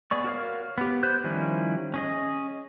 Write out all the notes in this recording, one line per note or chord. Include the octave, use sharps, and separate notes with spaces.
B3 G#4 D5 C#6
F#4 A#4 C#5 F5
B3 G4
B3 C5 F#6 G6
D#3 F3 G3 C#4 E4
C#4 G#4 D#5